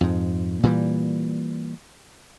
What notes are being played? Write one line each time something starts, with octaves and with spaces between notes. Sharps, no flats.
F2 G#2
A#2 E3 G3